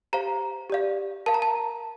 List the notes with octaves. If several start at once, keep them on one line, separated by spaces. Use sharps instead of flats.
G4 C5 F5 A#5
G4 D5 F5
A#4 F5 A5
A#5
A5